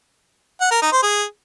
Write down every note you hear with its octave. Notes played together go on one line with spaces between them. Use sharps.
F#5
A#4
D#4
C5
G#4